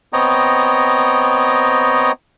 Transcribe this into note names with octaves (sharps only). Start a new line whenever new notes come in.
B3 C4 C#5 D#5 G5 A#5